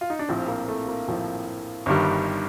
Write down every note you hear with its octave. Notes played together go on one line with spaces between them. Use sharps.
F4
D#4
D4
A#1 A2 F3 C4
A#3
A3
A#3
A#1 A2 F3
G1 G2 D#3 G3